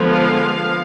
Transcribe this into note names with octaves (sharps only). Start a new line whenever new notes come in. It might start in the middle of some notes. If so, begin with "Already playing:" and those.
Already playing: D3 F3 G#3 B3
F5